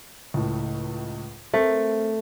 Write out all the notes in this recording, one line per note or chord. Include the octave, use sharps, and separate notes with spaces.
C#2 A2
A3 C4 A4 A#4